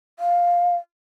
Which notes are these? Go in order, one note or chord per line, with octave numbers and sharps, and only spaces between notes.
F5